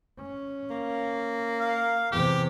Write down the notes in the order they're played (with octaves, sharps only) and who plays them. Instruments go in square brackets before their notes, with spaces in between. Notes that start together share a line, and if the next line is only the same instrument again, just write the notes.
[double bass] C#4
[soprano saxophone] A#3
[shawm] F5
[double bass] E2 C3 [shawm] G4